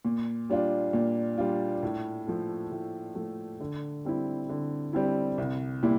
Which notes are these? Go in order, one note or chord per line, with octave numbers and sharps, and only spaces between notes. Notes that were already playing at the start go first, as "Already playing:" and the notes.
A#2
G3 D4 F4
A#2
G3 D4 F4
A2
F3 A3
A2
F3 A3
D3
G3 C4 E4
D3
G3 C4 E4
C2
A#2 G3 E4